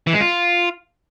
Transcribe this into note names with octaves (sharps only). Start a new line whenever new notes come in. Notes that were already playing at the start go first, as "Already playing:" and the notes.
E3
G#3
F4